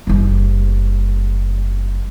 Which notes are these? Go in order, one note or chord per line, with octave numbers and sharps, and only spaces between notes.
F#1 G3